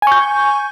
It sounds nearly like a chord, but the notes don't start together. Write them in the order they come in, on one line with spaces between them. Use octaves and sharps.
G#5 C#6 G6